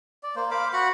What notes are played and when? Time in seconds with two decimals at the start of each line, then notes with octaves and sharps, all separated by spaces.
0.23 D5
0.36 A#3 C5
0.51 C5 F5 B5 D6
0.73 F#4 F#5 B5